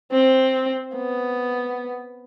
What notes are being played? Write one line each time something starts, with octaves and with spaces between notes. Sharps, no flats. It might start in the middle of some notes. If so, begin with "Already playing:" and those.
C4
B3